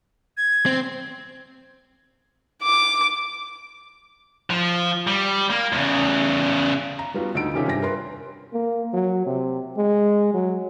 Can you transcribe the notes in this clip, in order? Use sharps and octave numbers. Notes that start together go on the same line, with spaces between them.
G#6
C4
D6
F3
G3
A#3
E2 C#3
A#5
G3 B3 F4 F#4
D2 D#4 E6 D7
C3 D#3 C#4 F4 G4 G#4
G2 C3 G5 G#5 A#6
A#4 B4 C6
A#3
F#3
C3
G#3
F#3